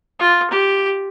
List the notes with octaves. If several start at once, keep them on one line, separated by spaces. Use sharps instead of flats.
F4
G4